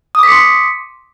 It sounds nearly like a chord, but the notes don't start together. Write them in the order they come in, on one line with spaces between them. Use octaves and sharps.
D#6 D6 B6 C#7 C6